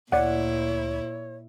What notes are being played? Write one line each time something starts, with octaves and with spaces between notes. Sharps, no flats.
D2 A#2 E4 C#5 D5 F#5